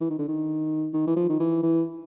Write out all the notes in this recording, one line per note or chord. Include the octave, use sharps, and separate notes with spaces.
E3
D#3
D3
D#3
D#3
E3
F3
D#3
E3
E3